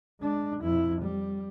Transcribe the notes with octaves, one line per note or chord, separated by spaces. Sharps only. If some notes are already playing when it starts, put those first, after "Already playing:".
G#3 D4
F2 E4
G3